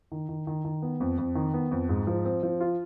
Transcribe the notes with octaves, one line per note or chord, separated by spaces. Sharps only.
D#3
D#3
D#3
D#3
B3
F2
F2
D#3
B3
F2
G#2
F3
C4
F3
F4